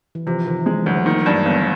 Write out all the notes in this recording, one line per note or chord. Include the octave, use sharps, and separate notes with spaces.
E3
C3 F3
C3 D#3
E3 G#3
D2 F#3
D#3 A#3
G2
G1 B3
C4